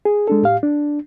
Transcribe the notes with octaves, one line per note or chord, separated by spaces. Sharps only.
G#4
G#3 D4 A4
A2 G4 F5
D4